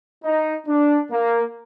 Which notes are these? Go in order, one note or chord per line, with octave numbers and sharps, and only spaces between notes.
D#4
D4
A#3